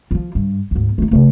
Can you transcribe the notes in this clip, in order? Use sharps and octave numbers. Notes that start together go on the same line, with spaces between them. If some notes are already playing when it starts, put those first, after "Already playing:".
F3 F4
G2
D2 G#2
A3 D#4
C#3 A3